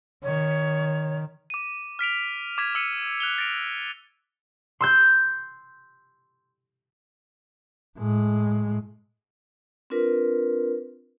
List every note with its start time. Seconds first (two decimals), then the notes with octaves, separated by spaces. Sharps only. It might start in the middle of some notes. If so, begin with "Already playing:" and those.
0.23 D#3 C#5
1.50 D6 D#7
1.99 F6 B6 D7 F7
2.58 D6 G#6 B6 F7
2.75 E6 C#7 D#7
3.20 F#6 F7 G7
3.38 A6 A#6 D7 F7
4.80 C6 E6 G6
7.97 A2 G#3
9.90 C4 D4 F4 A#4 B4